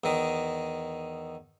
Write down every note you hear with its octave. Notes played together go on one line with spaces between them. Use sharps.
E2 D#3